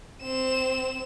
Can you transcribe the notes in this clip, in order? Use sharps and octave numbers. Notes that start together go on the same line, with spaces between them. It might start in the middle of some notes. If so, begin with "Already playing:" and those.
C4 E7